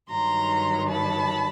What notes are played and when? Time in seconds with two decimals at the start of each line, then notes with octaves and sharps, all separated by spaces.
0.10 G2 D#3 F#3 A#5 C6
0.89 A5 B5